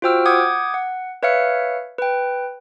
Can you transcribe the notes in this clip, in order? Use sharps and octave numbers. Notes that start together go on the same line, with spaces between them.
F4 F#4 C5 G5 E6 F6
F#5 D6 D#6 G6 G#6
F#5
B4 C#5 E5 F5 F6 C#7
B4 G5